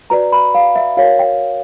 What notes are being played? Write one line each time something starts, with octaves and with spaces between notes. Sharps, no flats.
F#4 B4 D5 A#5
B5
F5
E5
F#4 A#4 C#5 F5
G5